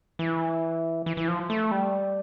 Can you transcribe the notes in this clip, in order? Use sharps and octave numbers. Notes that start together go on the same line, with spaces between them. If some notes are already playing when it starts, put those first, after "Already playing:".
E3
E3
E3
F3
A3
G3